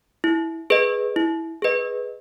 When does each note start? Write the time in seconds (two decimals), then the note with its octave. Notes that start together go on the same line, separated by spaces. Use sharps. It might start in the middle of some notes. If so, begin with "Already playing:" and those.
0.24 E4
0.70 G#4 B4 D#5
1.16 E4
1.62 G#4 B4 D#5